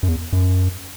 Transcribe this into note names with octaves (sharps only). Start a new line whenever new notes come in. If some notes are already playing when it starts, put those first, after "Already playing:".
F#2
E2
F#2